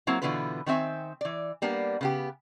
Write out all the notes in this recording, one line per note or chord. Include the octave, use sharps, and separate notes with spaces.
F#3 A#3 C4 E4
B2 D3 E3 B3 F4 B4
D#3 B3 C4 E5 G#5
E3 D5
G3 A#3 B3 D4
C#3 B3 G4